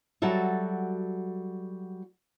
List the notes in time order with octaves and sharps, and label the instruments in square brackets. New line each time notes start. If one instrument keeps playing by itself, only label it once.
[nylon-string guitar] F#3 G3 F#4 A4 E5